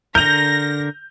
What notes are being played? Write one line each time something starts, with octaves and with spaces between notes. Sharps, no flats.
D3 A#4 G6 A#6 F7